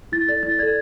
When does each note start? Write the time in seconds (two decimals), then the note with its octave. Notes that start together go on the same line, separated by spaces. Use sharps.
0.12 E4 A6
0.28 A4 D5 A6
0.43 E4 A6
0.59 A4 D5 G#6